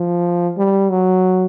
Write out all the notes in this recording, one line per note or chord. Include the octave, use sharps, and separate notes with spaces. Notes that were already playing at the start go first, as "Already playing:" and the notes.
Already playing: F3
G3
F#3